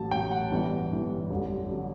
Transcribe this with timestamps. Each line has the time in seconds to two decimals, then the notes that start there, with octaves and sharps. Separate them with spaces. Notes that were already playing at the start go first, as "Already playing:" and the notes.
Already playing: A1 A2 F#3 A5
0.11 A1 A2 F#3 G5
0.31 F#5
0.51 G1 G2 E3
0.90 G1 G2 E3
1.31 A1 G2 D3 F#3
1.71 D3 F#3